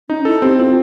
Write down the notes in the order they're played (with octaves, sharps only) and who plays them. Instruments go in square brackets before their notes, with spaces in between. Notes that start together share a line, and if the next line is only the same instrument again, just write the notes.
[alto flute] C#4 [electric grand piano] D#4
[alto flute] E4 [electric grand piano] A4
[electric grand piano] C4 [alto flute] G4
[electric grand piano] C4 [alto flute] F4